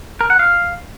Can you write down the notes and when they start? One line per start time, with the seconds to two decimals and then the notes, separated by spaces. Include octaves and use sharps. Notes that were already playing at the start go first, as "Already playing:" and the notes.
0.21 A#4
0.30 F#5
0.39 F5